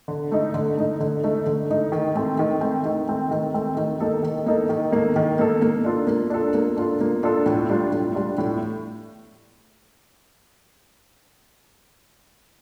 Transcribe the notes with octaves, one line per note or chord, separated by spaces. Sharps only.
D3
A3 D#4
D3
A3 D#4
D3
A3 D#4
D3
A3 D#4
D#3
A3 C4
D#3
A3 C4
D#3
A3 C4
D#3
A3 C4
D#3
A#3 D#4 A4
D#3
A#3 D#4 A4
D#3
A#3 D#4 A4
D#3
A#3 D#4 A4
A#3
D4 F4 A4
A#3
D4 F4 A4
A#3
D4 F4 A4
A#3
D4 F4 A4
A2
G3 D4 F4
A2
G3 D4 F4
A2